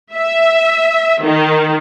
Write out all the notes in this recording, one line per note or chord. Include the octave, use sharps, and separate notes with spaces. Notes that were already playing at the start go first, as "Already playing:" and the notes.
E5
D#3